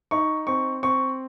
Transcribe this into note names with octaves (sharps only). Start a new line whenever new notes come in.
D#4 C#6
C4 C#6
C4 C#6